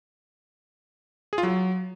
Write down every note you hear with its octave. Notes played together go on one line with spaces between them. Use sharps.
G#4
F4
F#3